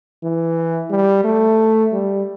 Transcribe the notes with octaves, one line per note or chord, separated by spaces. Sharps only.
E3
G3
A3
G3